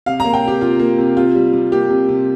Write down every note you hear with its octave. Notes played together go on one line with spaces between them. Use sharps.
C3 F5
A#3 A#5
G5
C3 G4
C3 F4
A#3
C3
C3 F4
G3
C3
A#3 G4
C3
C3